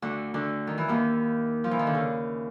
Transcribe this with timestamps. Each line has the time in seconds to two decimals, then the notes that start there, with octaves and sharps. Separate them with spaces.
0.02 D2 D3
0.34 D2 D3
0.67 D#3
0.78 E3
0.88 D#2 D#3
1.64 F3
1.71 E3
1.79 D#3
1.87 D3
1.94 C#3